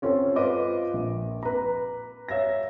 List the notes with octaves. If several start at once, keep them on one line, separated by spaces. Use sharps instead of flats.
C4 C#4 F4 A4 F5
F4 B4 C5 D#5 D6
A#1
B4 A#5
C#5 E5 F5 A#6